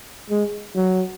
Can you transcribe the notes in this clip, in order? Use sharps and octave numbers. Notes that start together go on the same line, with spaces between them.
G#3
F#3